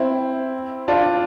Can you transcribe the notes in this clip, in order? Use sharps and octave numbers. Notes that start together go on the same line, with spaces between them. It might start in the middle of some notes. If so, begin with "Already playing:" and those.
Already playing: C4 E4
D4 F4